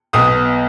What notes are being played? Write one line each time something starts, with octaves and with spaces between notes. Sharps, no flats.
B1 B2 B3 D#6